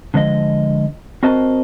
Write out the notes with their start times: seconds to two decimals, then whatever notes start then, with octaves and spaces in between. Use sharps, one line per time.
0.14 D3 F3 G#3 D#5
1.23 C4 F#4 A#4 C5 D#5 A5